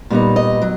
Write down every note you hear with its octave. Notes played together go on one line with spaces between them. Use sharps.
A#2 G3 B3 D#4
D#5
F#3